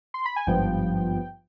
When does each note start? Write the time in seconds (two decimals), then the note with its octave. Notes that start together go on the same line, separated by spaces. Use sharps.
0.14 C6
0.25 B5
0.36 G#5
0.47 G#1 G2 F3 B3 G5